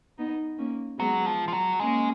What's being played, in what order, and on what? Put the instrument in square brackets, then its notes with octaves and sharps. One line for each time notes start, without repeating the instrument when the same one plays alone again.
[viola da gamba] B3 D#4
A#3 C#4
[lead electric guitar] F#3 [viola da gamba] G#3 B3
[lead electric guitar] F3
F3
F#3
[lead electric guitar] G#3 [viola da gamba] A#3 C#4